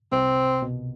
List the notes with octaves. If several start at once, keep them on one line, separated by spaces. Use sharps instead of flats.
C2 C3 C4
B2